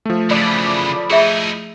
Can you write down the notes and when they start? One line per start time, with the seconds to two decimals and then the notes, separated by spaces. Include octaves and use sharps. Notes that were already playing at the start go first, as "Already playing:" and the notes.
0.06 F3 A3
0.31 C#3 E3 D5 B5
1.10 D#4 E4 G#4 E5